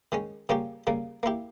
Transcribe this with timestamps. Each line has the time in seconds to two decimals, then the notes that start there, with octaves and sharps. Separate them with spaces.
0.12 D#3 G#3 C#4
0.49 C#3 G3 A#3 C#4 G4
0.87 C#3 G3 A#3
1.23 A#3 E4 G4